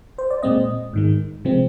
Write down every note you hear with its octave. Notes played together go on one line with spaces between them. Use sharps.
C5
D5
A#2 G#3 C4 D#5
G#2 D#3 G#3
C3 F3 G#3 C4